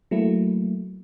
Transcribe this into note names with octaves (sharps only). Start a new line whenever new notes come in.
F#3 A3 A#3 E4